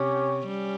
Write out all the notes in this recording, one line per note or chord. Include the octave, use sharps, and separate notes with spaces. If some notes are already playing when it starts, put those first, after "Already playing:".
Already playing: C3 C#4 G4 C#5
G3 C#4